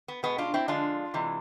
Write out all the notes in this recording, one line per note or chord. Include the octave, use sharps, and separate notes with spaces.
B3
B2 G#3 B3
D4 F4
C4 E4
D3 F3 G#3 D4 F4
C3 E3 G#3